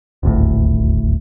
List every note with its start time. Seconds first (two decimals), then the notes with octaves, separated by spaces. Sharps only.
0.23 D#1 G#1 D2 A2